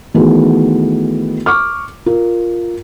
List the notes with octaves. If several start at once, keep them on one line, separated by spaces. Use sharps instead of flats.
D#3 E3 A3 B3 F#4 G#4
C#6 D6 F6
F4 A#4